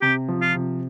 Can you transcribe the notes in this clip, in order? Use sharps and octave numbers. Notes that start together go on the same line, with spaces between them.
C3 G4
F3
F4
C3